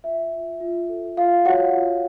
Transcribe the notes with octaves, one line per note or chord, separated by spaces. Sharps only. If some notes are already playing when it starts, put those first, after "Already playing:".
F4 E5
F4
F4
A4
F4 F5
F#4 C#5 F#5
F4